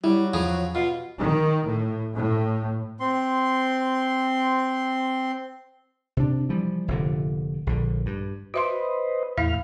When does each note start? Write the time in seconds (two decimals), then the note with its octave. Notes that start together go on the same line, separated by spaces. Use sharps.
0.04 F#3 G3 E4
0.33 E2 C#3 F3 G#4
0.75 B2 F4
1.19 D#3
1.65 A2
2.15 A2
3.00 C4 C6
6.17 C3 D4
6.49 E3 F3 G3
6.88 F1 A#2 D3
7.67 A#1 D3
8.06 G2
8.54 F#4 B4 C5 D#5 E5 C6
9.38 E2 A2 E4 E5 F5 F6